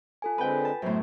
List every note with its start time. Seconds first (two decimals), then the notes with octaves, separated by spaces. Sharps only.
0.22 F4 A4 G#5
0.38 D3 G#3 C4 B4 G5
0.65 A5
0.82 F#2 A2 B3 C5